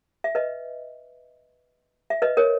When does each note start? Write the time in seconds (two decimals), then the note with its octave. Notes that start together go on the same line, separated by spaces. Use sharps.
0.24 E5
0.35 B4 D#5
2.10 E5
2.22 B4 D#5
2.37 A#4 C#5